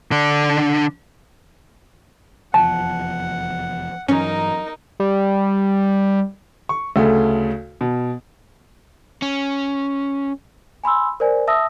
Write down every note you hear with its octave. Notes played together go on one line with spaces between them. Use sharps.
D3 D4
F1 E2 F3 F#5 A5
G2 E3 F#3 C#4 D#4 A#4
G3
C#6
D2 C#3 A3
B2
C#4
G#5 B5 C6 E6
A#4 C5 D5 G#5
E5 A5 D#6 E6 A#6